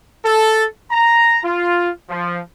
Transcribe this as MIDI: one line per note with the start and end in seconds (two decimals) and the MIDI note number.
0.23 0.65 69
0.91 1.39 82
1.44 1.89 65
2.09 2.40 53